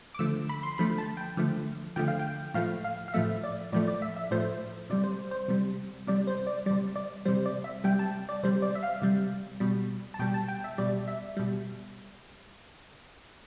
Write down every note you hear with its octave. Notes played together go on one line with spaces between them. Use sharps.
D6
D3 F3 A3 E6
B5
C6
D3 F3 A3 B5
A5
G5
D3 F3 A3
D3 F3 A3 G5
F5
G5
A2 F3 A3 F5
F5
F5
A2 F3 A3 E5
D5
A2 F3 A3 D5
D5
E5
E5
A2 F3 A3 C5
C3 G3 D5
C5
C5
C3 G3
C3 G3 D5
C5
D5
C3 G3 D5
D5
C3 G3 C5
D5
E5
C3 G3 G5
A5
D5
C3 G3 C5
D5
E5
F5
C3 G3
B2 G3
A5
B2 G3 G5
A5
G5
E5
B2 G3 D5
E5
B2 G3